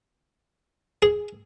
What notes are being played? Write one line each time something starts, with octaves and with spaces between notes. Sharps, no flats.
G#4